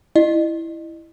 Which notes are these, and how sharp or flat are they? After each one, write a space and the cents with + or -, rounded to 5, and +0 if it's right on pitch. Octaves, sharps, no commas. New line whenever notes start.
E4 +0 D#5 -35